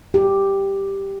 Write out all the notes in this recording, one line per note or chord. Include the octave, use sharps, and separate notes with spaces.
G4